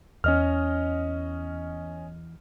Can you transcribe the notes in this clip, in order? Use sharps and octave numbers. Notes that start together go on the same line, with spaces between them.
E2 C#4 D#5 F6